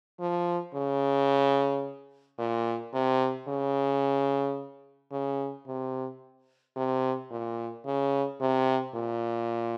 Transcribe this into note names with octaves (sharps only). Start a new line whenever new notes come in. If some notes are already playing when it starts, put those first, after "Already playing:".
F3
C#3
A#2
C3
C#3
C#3
C3
C3
A#2
C#3
C3
A#2